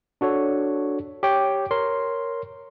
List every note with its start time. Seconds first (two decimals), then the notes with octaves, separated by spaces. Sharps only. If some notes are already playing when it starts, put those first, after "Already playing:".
0.21 D4 F#4 A4 C#5
1.23 G4 C#5 G5
1.71 A#4 C#5 C6